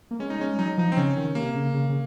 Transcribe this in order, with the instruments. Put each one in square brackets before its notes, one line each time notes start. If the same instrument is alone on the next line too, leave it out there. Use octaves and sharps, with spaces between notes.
[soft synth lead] A#3
[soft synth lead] G#3 [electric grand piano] C#4
[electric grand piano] D#4
[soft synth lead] G#3 [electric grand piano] C#4
[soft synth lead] F#3 [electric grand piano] D#4
[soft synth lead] F3 [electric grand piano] D#4
[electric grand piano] C4
[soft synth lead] C#3 [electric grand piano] C#4
[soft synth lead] D#3
[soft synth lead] C3 [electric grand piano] A#3
[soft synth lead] C#3
C#3
C#3